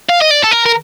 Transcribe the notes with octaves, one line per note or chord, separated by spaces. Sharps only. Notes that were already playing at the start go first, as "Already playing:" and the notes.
F5
D#5
D5
A4
A#4
A#4